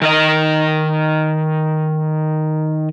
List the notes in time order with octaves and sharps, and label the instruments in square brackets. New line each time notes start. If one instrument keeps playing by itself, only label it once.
[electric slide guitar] D#3 A#4 D#5